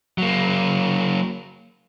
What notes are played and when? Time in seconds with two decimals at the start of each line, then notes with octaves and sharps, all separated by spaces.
0.18 F#3 A#3